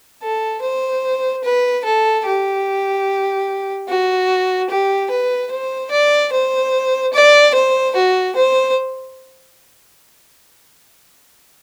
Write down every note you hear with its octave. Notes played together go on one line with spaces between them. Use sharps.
A4
C5
B4
A4
G4
F#4
G4
B4
C5
D5
C5
D5
C5
F#4
C5